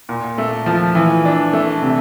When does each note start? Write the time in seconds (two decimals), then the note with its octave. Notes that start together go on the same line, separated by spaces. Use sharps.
0.09 A#2
0.38 A3
0.66 F3
0.95 E3
1.25 D4
1.53 A3
1.82 C3